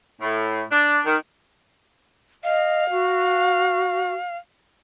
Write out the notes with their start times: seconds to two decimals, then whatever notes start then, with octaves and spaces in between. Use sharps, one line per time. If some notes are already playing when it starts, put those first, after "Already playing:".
0.22 A2
0.72 D4
1.06 D#3
2.44 D#5 F5
2.90 F#4